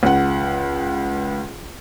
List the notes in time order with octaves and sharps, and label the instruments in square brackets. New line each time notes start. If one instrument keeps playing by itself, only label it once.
[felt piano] C#2 F#5